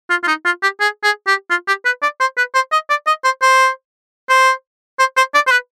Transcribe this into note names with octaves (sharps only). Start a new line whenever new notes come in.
F4
F4
D#4
F4
G4
G#4
G#4
G4
F4
G4
B4
D5
C5
B4
C5
D#5
D5
D#5
C5
C5
C5
C5
C5
D5
C5
B4